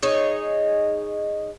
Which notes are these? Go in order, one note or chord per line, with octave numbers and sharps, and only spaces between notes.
D#4 G#4 C#5